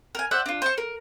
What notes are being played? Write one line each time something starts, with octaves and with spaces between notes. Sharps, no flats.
A#4 G#5
C5 D5 E5 F#5
D4 F4
C5 C#6
A#4